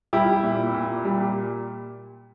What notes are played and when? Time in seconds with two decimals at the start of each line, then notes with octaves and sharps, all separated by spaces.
0.13 G3 E4 G4
0.43 A#2
0.74 A#2
1.05 G3